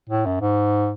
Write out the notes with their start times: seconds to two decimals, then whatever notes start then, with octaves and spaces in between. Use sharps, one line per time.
0.09 A2
0.26 F#2
0.41 G#2